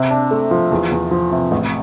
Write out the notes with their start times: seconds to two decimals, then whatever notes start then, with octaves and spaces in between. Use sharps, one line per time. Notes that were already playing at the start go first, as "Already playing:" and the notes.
Already playing: C3
0.10 D4
0.31 A3
0.51 F3
0.72 E2
0.91 E2
1.11 F3
1.32 C3
1.51 A1